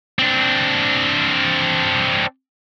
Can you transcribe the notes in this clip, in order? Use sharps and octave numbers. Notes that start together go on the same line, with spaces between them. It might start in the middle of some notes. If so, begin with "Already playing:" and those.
C4 D4